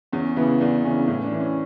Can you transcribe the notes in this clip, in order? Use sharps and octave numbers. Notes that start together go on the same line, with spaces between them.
E2 C#4
C#3 E3 B3
E2 D4
C#3 E3 C#4
A2 C#4
D4
E3
C#4